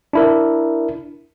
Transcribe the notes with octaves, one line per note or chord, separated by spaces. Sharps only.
D4 E4 A#4